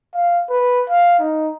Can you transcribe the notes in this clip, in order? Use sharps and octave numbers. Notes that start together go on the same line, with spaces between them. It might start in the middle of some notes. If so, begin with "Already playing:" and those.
F5
B4
F5
D#4